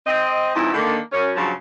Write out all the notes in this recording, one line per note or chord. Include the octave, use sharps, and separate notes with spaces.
C4 D#5
E2 G#2 C#3 F3 C4 E4
D3 D#3 A#3
F#2 C#4 C#5
G2 C#3 F3 F#3